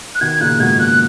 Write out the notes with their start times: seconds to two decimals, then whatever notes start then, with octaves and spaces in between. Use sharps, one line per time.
0.15 F#6
0.21 B2 D#3 G#6
0.40 A#2 C#3 F#6
0.59 G#2 B2 G#6
0.79 A#2 F#6